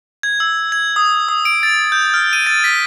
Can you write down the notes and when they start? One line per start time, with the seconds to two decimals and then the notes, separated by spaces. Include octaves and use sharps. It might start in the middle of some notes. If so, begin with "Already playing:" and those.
0.23 G#6
0.40 E6
0.72 G#6
0.96 D#6
1.29 D#6
1.45 D7
1.63 A6
1.92 G6
2.14 F6
2.33 D#7
2.47 A6
2.64 B6